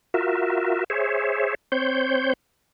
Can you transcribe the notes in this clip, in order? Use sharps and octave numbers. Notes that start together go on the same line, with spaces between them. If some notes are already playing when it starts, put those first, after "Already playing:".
F4 F#4 A#4 E5
G#4 C5 C#5 E5
C4 C5 C#5 G6